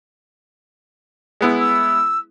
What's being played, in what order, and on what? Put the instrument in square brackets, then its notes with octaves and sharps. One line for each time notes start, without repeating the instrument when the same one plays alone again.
[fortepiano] G#3 B3 E4
[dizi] E6